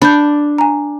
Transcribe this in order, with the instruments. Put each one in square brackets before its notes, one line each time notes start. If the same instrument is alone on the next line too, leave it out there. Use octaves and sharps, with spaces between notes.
[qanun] D4 [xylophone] B5 G6
[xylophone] G#5 A#5